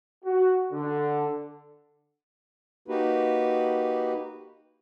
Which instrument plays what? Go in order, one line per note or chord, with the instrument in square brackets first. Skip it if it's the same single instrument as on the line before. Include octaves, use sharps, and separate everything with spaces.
[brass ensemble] F#4
D3
[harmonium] A#3 D#4 F#4 G4 B4